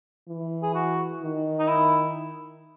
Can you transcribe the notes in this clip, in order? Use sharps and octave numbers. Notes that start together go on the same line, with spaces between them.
E3
G#4
F#4
D#3
D#4
E4